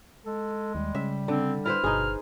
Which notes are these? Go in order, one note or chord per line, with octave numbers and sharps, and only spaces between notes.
G#3 A4
D#2 G3
C#3 E5
D3 C4
E4 B4 C5 F6
G1 B2 D#4 G#4